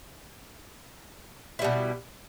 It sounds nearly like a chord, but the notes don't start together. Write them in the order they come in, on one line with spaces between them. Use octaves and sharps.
E4 G3 B2